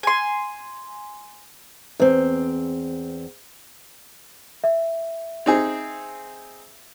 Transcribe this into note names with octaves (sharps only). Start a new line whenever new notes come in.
G#5 C6
E2 C4
E5
C4 D#4 G#4